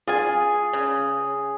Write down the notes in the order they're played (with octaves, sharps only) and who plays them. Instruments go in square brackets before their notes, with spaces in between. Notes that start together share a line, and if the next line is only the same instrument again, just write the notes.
[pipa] F4 G#5 [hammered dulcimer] G#4
[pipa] C#3